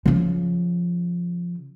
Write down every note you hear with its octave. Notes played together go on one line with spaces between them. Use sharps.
C#3 F3